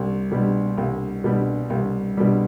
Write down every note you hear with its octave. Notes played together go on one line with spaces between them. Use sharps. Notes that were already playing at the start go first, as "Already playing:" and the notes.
Already playing: C2
B2 G3
C2
B2 G3
C2
B2 G3